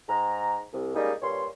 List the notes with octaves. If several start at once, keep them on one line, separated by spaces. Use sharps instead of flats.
G#2 A#5
C2
C#3 G3 G#3 A#3 D#4
G2 A#2 C#5 C6